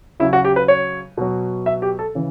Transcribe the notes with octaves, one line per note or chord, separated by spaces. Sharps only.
C#3 F#3 E4
F#4
G4
B4
C#5
B2 F#3
E5
G4
A4
C#3 E3